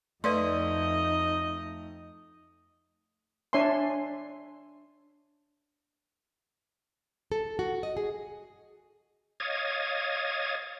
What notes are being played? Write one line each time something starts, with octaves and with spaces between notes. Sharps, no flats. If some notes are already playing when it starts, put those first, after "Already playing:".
F2 A3 D#4 B4 D5 D#5 C6
D4 C#5 E5 G#5 C6
A4
F#4
D#5
G#4
C#5 D#5 F5 D#6 G#6 A6